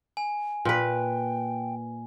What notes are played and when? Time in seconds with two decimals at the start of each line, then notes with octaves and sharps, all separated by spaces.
0.17 G#5
0.65 A#2 B4 G5